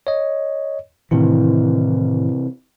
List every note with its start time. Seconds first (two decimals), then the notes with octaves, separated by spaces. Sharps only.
0.07 C#5 D#5
1.11 A2 C3 D#3 E3 E4